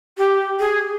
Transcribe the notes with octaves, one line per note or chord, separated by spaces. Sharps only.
G4
G#4